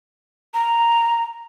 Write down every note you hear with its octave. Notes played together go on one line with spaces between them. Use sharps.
A#5